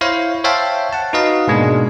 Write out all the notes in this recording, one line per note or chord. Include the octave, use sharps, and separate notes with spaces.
E4 C5 C#5 F5
C5 C#5 E5 F5 G5 A5
F#5 A5
D#4 F#4 B4 D#5 F5
G#2 B2 G#3 A#3 D4